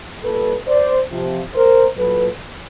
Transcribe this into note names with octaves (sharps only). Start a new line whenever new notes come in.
A#2 G3 A4 B4
C5 D5
C3 F3
A#4 C5
A#2 F#3 A4 B4